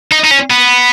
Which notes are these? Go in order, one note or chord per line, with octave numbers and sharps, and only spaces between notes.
D#4
D#4
C#4
B3